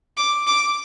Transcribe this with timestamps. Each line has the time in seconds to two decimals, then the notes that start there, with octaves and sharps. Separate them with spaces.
0.17 D6
0.47 D6